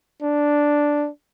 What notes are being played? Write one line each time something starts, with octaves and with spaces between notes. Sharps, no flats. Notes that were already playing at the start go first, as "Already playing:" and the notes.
D4